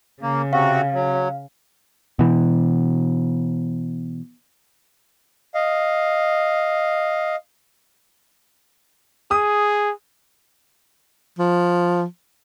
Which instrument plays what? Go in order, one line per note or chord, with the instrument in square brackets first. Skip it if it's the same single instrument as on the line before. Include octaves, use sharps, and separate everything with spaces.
[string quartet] C#3 [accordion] A#3
[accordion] C3 C4 F#4 [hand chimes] F5
[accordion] F#3
[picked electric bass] B2 E3
[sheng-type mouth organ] D#5 F5
[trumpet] G#4 [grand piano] D#6
[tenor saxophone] F3